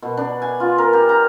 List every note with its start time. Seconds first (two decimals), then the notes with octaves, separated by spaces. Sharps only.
0.02 B2
0.17 D4
0.42 G#5
0.60 F4
0.78 A#4
0.93 G4
1.09 A#5